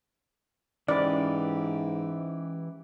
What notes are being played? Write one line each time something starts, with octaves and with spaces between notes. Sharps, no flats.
G#2 E3 C#4 G4 D5 B5